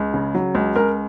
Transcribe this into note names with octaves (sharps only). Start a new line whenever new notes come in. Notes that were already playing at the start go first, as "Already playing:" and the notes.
Already playing: C#2
C#3
F#3
C#2
C#2 A#4